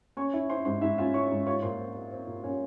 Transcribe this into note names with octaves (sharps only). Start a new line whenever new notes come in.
C#4 C#5 C#6
E4
E4 C5 C6
G#2 C5 C6
G#2 E4 E5
C#4 F4 F5
E4 C#5 C#6
G#2
F4 C#5 C#6
A#2 C5 C6
C4
C4
C4
A#2
A#2 C#4 C#5